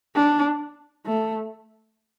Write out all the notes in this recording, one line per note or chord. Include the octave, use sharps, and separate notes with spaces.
D4
A3